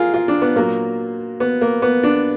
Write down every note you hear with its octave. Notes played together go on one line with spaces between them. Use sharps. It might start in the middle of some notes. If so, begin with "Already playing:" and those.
Already playing: F4 G#4 A#4
F4
D4
B3
A#2 F#3 A#3
B3
A#3
B3
D4